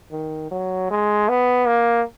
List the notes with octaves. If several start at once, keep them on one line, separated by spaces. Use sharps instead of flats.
D#3
F#3
G#3
B3
A#3